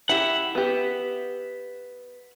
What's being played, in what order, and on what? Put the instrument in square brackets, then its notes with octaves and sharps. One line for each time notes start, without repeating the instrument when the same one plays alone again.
[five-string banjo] E4 G4 [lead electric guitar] E5 F#5
[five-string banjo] B3 G4